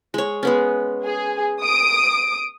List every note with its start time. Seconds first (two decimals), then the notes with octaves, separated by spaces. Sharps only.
0.14 G#3 C#5
0.43 G#3 B3 C#4
1.04 G#4
1.62 D#6 D7